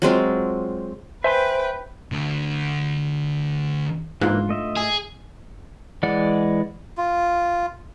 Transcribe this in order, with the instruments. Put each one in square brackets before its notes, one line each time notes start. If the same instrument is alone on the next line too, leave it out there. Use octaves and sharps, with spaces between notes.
[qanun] F#3 G#3 C4 F4
[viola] B4 G5 [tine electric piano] C5 [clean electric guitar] E5 G#5 C6
[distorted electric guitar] D2 D3
[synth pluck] G#2 [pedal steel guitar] E3 A#3 F#6 [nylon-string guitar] D4 F4
[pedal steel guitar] A3 D#5 E5
[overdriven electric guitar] G#4
[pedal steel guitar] E3 G#3 D5 F#5
[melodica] F4